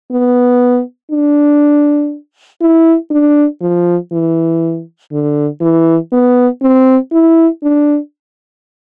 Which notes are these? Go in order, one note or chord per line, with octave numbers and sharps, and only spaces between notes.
B3
D4
E4
D4
F3
E3
D3
E3
B3
C4
E4
D4